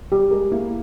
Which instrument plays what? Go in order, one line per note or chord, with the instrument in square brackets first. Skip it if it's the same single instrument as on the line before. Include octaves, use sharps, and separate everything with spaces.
[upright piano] G3 [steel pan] G4
[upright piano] G#3 [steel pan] A#4
[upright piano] A#3 [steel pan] E4